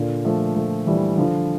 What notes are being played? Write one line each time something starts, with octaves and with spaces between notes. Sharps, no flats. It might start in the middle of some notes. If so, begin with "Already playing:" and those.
Already playing: A#2 D3
F3 A3
F3 A3
E3 G3
D3 F3